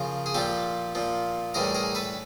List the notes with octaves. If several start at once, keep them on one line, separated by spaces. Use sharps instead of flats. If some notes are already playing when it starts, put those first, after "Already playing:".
Already playing: C#3 F3 A#4
G#4
A#2 F3 G4 A4
A#2 F3
A2 E3 G3 G#4 A#4
G#4 A#4
A4 B4